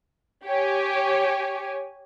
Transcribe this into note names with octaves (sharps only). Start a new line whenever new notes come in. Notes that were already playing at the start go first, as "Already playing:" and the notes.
G4 C#5 G#5